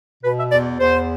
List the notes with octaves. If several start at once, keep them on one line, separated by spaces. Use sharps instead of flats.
B2 B4
E5
E2 D5
E2 C5